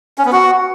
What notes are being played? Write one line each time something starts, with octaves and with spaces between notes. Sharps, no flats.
C#4
B3
F#4